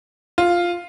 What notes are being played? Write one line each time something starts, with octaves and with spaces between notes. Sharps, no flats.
F4